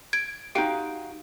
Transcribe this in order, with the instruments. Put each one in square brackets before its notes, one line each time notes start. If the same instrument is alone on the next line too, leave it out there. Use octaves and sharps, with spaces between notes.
[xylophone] G#6 D7
[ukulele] D#4 F#4 F5 [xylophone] G4 G5 D7